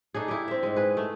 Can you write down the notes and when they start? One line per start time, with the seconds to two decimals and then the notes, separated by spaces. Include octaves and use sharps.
0.14 A3 D4 D#4 G#4
0.28 E4 G4
0.48 C4 E5
0.63 G#2 G#3
0.76 G#4 B4
0.97 A3